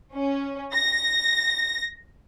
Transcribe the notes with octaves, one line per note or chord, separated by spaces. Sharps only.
C#4
A#6